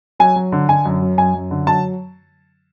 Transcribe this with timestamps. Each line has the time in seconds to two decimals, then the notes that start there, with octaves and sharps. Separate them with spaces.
0.20 F#3 G#5
0.36 F#3
0.52 D3
0.69 D3 G#5
0.85 F#2
1.02 F#3
1.18 F#2 G#5
1.34 F#2
1.51 D3
1.67 F#3 A5